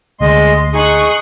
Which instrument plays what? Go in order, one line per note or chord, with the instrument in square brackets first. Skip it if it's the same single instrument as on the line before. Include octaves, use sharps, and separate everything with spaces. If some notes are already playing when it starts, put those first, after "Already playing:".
[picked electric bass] D2 [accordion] G#3 D#5 [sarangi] C6
[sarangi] D#4 [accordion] G#4 [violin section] C#6 D#6 F#6